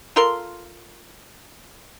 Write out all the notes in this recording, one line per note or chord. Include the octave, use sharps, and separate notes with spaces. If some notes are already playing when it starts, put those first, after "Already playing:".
F4 A4 A#4 C6